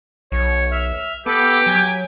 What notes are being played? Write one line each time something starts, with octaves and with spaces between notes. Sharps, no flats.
B1 C#5
E5 F6
B3 G4 A4 B4 D6
F#3 G#5